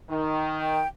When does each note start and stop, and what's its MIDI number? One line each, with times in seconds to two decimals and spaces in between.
0.10 0.80 51
0.59 0.87 79